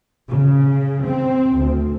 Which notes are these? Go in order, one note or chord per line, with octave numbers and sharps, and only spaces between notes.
C#3
C4
D2